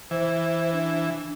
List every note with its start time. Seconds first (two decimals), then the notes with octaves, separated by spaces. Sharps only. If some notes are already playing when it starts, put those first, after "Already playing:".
0.11 E3 C5
0.73 D4